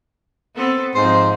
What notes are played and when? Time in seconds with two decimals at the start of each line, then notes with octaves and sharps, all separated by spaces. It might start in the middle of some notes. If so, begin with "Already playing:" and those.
0.55 B3 C4 A4
0.95 G#2 F3 C4 C5 D#5